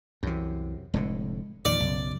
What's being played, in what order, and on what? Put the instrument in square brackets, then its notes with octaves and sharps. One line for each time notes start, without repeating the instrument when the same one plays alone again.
[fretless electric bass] C2 E3 [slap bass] F#2 C3
[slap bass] F1 A2 D3 [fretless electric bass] G#3
[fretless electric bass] E2 A#2 F3 [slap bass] D#3 [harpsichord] D5
[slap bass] B1 [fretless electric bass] F#2 C#3